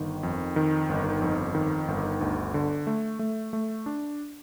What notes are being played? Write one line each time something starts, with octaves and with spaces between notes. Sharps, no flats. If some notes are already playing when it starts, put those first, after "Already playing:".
Already playing: G1 D#3
F2
D#3
G1
F2
D#3
G1
D2
D3
A3
A3
A3
D4